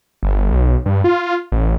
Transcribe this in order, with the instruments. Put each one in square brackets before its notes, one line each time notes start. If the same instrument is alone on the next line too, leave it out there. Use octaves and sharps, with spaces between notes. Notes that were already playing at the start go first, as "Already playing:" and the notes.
[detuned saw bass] G1
B1
G2
F4
A1